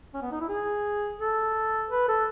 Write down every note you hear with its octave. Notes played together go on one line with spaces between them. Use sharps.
C#4
B3
D#4
E4
G#4
A4
B4
A4